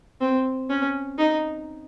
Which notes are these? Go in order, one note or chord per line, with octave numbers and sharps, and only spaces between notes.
C4
C#4
D#4